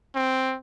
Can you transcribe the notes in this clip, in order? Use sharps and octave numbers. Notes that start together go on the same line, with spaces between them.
C4